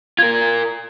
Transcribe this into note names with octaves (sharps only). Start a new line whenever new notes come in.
F4 A#4 G#6